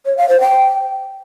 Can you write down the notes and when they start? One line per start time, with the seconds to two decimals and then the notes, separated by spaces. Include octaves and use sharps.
0.06 C#5
0.17 F5
0.29 C5
0.41 G5